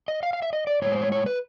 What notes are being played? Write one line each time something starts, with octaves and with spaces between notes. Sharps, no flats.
D#5
F5
F5
E5
D#5
D5
A2 E3 G#3 C#5
C5
C#5
C#5
B4